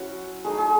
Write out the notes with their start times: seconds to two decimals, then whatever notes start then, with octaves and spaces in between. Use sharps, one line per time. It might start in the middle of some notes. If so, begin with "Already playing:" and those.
Already playing: F#3 C#4 E4 F#4
0.45 A3 D#4 G#4
0.58 G#4